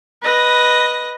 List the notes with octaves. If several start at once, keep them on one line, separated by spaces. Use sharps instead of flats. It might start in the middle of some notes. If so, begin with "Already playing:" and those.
B4 D#5 A#6